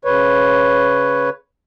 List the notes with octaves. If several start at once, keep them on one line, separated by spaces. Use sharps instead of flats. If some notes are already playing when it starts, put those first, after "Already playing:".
C#3 B4 C#5